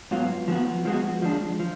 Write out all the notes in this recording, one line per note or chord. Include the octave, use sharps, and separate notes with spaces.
G#2 F#3 B3 F4
F3 G#3 B3 F#4
F3 G#3 B3 F#4
F3 G#3 D4
F3